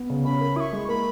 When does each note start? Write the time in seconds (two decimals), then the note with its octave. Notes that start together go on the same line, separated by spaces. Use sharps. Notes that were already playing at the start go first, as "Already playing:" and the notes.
Already playing: B3
0.10 C#3
0.25 C#4 B5
0.41 A#4
0.56 E4 C#6 D#6
0.72 G#3
0.88 A#3 B5